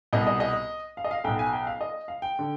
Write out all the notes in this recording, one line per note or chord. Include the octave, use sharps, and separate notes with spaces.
C2 B2 D#5
D#5
D#5
F5
D#5
F5
B1 B2 G5
G#5
G5
F5
D#5
F5
G5
D3